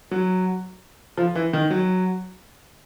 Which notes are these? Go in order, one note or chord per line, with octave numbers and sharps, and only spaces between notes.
F#3
F3
E3
D#3
F#3